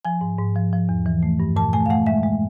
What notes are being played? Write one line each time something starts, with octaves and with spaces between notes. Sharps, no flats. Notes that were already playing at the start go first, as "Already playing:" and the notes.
F3 G#5
G#2
G#2
F3
F3
E2
E3
A3
G2
A#2 A5
A3 G#5
F5
A3 F#5
G#3 E5
G#3